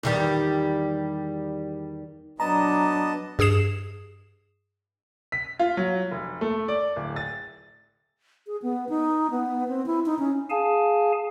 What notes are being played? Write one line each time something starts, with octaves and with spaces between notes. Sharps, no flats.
E2 D#3 G3
F#3 B3 D4 D#5 A5 A#5
G2 G#4 D#6 C7 E7
B6
F4
F#3
F1
A3
D5
D1
A6
G#4
B3
D#4
B3
C4
E4
D#4
C#4
G#4 F5 G#5 A5